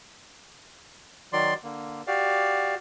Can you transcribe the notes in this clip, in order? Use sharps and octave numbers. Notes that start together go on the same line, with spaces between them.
D#3 F#3 D5 C6
D3 A#3
F#4 G4 D5 F5